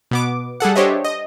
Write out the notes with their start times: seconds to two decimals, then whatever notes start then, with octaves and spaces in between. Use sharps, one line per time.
0.11 B2 B3 D6
0.60 G3 G#4 A4 F#5
0.75 D4 G4 C5 C#5 D#5 E5
1.04 D#5